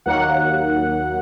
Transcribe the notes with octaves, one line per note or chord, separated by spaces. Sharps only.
D#2 F#3 A#3 F#5